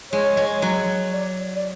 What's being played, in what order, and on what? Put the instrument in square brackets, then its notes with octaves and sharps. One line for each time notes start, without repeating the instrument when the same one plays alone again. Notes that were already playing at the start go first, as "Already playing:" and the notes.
[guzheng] G#3 [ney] C#5
[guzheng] G#3
F#3
[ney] D5
D5